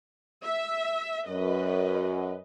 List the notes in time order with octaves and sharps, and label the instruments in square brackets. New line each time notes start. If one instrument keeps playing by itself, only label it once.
[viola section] E5
[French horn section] F#2 [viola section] B4 D#5